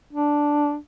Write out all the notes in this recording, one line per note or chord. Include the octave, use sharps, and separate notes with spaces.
D4